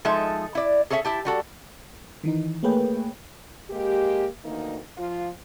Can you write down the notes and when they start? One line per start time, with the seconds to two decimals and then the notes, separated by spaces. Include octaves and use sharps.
0.05 F3 G#3 D#4 A4 E5
0.55 E4 D5
0.90 G#4 A4 C#5 D5 E5
1.05 E4 G4 A5
1.25 G3 F#4 A4
2.23 D#3 E3 D#4
2.63 A3 A#3 G#4 B4 C#5 G5
3.71 G#3 A#3 G4
4.45 D2 D#3 E3 A#3 D#4
4.98 F3 F4